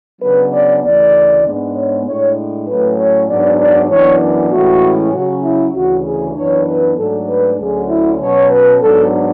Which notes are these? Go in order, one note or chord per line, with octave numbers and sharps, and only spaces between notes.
C#3 F#3 B3 D4 B4
D5
D2 C#3 E3 A3 D5
G#2 G#3 B3 D4
C#5
A2 G#3 D4 C#5
A2 F#3 A3 C#4 B4
C#5
G#2 F#3 B3 D4 D5
D5
F#2 E3 B3 D4 C#5
A2 E3 G#3 C#4 F#4
C#3 F#3 C#4 F#4
E4
D2 C#3 E3 F#4
G#4
F#2 E3 B3 D4 C#5
B4
G#2 F#3 A3 D4 A4
B4
D2 D3 F#3 C#4 G#4
E4
B2 F#3 C#4 C#5
B4
G#2 F#3 B3 D4 A4